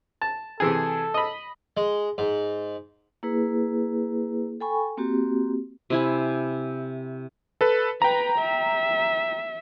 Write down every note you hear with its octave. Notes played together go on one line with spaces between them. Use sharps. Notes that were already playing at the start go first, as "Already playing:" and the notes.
A5
C3 E3 G#4 A4
D#5 B5
G#3
G#2
A#3 E4 G#4 B4
A4 G5 G#5 B5 C#6
A#3 C4 F#4 G4
C3 E4 G#5
A4 B4
B4 G5 A#5
E5